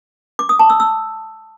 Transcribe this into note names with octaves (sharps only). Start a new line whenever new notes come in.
D6
D#6
A5
E6
E6